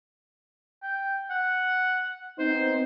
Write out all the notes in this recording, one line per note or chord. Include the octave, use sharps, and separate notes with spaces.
G5
F#5
B3 C4 D#4 C5